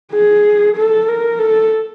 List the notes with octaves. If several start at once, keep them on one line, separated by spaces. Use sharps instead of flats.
G#4
A4
A#4
A4